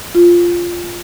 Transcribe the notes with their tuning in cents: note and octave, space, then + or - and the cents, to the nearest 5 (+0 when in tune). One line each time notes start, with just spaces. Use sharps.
F4 -5